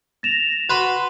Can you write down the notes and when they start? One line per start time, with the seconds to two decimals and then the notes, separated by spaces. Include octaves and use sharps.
0.23 A6 A#6 E7 F7
0.70 F#4 B4 C6